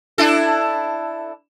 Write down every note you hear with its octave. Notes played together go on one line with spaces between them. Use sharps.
D4 E4 A4